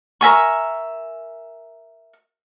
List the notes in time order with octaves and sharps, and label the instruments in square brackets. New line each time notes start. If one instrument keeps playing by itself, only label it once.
[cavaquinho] A#4 E5 G#5 C#6